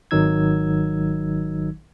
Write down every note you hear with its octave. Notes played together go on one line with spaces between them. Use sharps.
G#1 D#3 F#3 D#4 E6 G#6